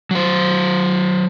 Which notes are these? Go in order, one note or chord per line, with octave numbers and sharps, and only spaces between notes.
F#3 C5